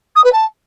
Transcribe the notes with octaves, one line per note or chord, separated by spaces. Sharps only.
D#6
B4
A5